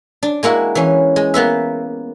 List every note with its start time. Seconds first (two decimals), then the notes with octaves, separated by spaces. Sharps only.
0.23 D4
0.43 G#3 A#3 E4 F#4
0.75 E3 C#4
1.16 G#3
1.34 A#3 B3 B4 E5